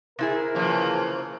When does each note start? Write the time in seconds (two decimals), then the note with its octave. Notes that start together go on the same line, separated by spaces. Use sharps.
0.19 C3 E4 G#4 A#4
0.55 C#3 E3 F3 A#3